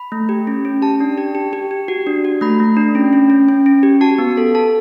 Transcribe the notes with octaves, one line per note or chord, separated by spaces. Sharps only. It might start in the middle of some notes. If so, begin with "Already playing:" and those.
Already playing: B5
A3
G4
C#4
C#4
G4 A5
D4
G4
G4
G4
G4
F#4
D4
F#4
A3 B5
A3
D4
C#4
C#4
C#4
C#4
C#4
G4
F#4 A5
B3
A4
A4 A5